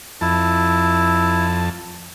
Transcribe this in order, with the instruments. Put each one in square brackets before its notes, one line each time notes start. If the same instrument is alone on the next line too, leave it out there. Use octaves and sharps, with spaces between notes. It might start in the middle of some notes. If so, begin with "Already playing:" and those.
[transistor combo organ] F2 A5 [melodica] E4